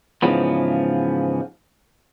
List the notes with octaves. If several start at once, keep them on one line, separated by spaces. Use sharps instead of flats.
G#2 C#3 E3 F3 B3